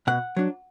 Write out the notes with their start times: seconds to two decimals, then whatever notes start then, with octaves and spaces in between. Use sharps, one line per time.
0.07 B2 F#5
0.37 F#3 D4